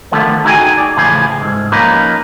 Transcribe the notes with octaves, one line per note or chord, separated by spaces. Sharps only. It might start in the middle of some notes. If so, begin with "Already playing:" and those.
D3 D#3 F3 A3 B3
D#4 E4 F#4 G#4 G5 G#5
D5
A2 C#3 E3 F3 G#4 C5
C2 G#2
F3 A#3 C#4 D#4 B4